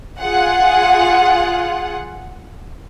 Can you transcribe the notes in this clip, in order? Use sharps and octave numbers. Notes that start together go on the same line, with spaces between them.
F4 G#4 F#5